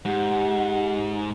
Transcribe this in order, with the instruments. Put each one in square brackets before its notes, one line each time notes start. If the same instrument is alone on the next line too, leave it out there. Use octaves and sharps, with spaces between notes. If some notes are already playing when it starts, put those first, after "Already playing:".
[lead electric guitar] G#2 [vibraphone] G4 [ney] F#5